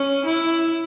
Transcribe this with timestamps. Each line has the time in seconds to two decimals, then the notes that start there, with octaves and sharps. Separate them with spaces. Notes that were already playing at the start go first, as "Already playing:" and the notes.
Already playing: C#4
0.25 E4